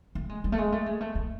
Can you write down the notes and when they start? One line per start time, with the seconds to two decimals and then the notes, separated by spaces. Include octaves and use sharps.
0.15 A3
0.29 G#3
0.44 G3
0.52 A3
0.58 G#3
0.72 A3
0.86 G#3
1.01 A3
1.15 A3